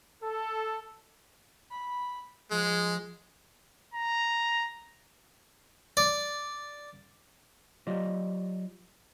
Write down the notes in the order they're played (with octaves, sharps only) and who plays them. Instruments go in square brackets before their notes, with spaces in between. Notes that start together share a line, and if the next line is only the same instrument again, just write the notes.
[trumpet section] A4
[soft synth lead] B5
[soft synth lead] F3 [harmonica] G#3
[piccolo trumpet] A#5
[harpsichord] D5
[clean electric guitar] F#3 F4 G4 D5 D#5